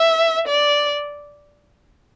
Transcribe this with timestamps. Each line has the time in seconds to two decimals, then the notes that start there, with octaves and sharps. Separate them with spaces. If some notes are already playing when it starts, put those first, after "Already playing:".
Already playing: E5
0.47 D5